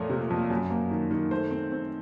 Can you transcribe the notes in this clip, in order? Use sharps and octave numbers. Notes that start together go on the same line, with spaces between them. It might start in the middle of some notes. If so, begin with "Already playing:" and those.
Already playing: F2 A#2 A3 A#4 C#5
C3
F2
F#2
A#3
D#3
D#3
A3 C5
C4
C4